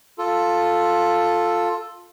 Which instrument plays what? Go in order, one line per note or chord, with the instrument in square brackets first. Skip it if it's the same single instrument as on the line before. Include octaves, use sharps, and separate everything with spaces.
[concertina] F4 A4